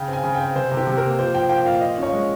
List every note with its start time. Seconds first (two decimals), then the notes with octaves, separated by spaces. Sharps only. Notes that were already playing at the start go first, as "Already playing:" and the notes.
Already playing: C#3 G5
0.08 C4
0.13 G#5
0.24 C#3
0.35 C4 G5
0.55 C3 C5
0.72 C3
0.77 G4
0.87 C3
0.97 A#3 A#4
1.19 F3 C5
1.34 F3 G5
1.49 A#2 G5
1.65 A#2 F5
1.81 F3 D#5
1.98 C#4 C#5
2.12 G#3